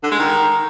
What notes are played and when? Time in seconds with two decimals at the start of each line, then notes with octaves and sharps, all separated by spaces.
0.03 D3
0.11 G#3
0.19 D#3